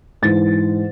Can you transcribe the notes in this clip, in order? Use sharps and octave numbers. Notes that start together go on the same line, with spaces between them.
G#2 E3 A6